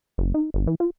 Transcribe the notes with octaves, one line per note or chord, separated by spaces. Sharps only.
F#1
D#4
G1
E3
F4